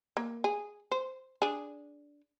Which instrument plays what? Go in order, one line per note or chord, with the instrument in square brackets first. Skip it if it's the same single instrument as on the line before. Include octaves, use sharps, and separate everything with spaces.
[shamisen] A#3
G#4
C5
D4 G#4